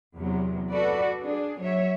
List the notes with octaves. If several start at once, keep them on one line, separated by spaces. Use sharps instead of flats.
E2 C3 F#3
F#4 A4 B4 D5
D4 G#4
F#3 C#5 E5